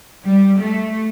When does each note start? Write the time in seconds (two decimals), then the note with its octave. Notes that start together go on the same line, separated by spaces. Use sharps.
0.24 G3
0.59 A3